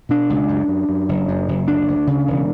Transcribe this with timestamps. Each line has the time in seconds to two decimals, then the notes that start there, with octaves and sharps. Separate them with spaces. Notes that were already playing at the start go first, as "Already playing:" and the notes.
0.09 B2 D4
0.30 C#2
0.48 F#2
0.68 F#2
0.89 F#2
1.09 F#1
1.28 F#2
1.48 F#1
1.68 D2 D4
1.88 D2
2.07 C#3
2.28 E1